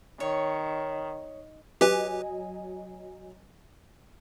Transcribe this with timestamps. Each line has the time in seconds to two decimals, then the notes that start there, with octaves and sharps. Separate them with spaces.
0.20 D#3 C#5
1.81 F#3 G4 B4 D#5 G#5